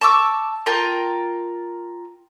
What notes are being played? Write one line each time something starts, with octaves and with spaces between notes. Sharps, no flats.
A5 C#6 D6 E6
F4 A#4 G5 A5